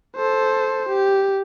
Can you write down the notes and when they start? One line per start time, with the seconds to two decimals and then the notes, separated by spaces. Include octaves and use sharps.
0.16 A4 C5
0.89 G4